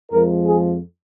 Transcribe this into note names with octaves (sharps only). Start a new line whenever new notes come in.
F2 F3 G#3 A#4
G#4